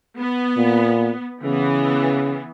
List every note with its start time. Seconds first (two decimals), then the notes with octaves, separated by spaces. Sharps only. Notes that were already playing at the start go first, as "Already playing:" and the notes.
0.19 B3
0.57 A#2
1.44 C#3 E3 B3